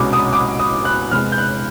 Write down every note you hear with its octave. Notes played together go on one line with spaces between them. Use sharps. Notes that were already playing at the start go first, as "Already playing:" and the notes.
Already playing: C2 B2 G#3 C#4 D6
D#6
D6
D#6
F#6
E2 C3 E3 G#3 F6
G6
F#6